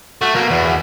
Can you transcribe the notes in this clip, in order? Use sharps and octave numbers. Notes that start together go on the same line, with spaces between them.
A3 F#4
B2 A#3
E2